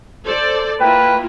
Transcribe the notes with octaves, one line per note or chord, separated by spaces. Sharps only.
A4 C5 D5
A#3 E4 F4 B4 G5